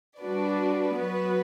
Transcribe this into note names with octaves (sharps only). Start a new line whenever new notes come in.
G3 D4 F#4 B4 D5
F#3 B3 F#4 B4